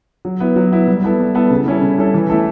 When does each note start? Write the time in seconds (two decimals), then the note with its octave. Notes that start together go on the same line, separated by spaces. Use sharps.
0.25 F#3
0.40 B3 E4
0.56 F#3
0.72 B3 E4
0.87 G3
1.04 B3 E4 A4
1.20 G3
1.35 B3 E4 A4
1.50 C#3
1.66 G3 C#4 E4 A4
1.82 C#3
1.98 G3 C#4 E4 A4
2.14 E3
2.30 A3 E4 A4